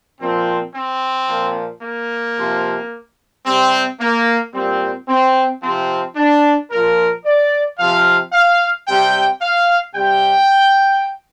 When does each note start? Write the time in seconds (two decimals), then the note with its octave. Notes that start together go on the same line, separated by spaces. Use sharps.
0.20 A#2 F3 C4
0.74 C4
1.28 A#2 F3
1.82 A#3
2.37 C3 F3
3.46 C3 G3 C4
4.00 A#3
4.54 A#2 G3 C4
5.08 C4
5.62 C3 F3 C4
6.16 D4
6.71 A#2 F3 A#4
7.25 D5
7.79 C3 F3 F5
8.33 F5
8.87 C3 G3 G5
9.41 F5
9.95 C3 G3 G5